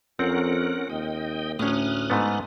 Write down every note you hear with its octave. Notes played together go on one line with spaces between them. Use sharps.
F2 C4 C#4 A#4 F#5
D#2 D#5 G5
D2 A2 C#4 D#6 F6 F#6
G#2 A3 B3